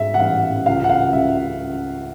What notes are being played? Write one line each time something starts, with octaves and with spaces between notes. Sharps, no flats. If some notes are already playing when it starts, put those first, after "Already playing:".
Already playing: G#2 G#3 E5
F#5
A1 F5
C#2 F5
F#5
F5
C#2 E5